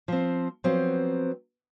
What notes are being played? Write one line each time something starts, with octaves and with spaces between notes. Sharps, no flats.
F3 C4
F3 F#3 B3 C4